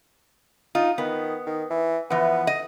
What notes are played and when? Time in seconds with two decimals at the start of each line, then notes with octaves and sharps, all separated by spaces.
0.75 D#4 F4
0.98 D#3 B3
1.46 D#3
1.70 E3
2.10 E3 F3 B3
2.47 D#5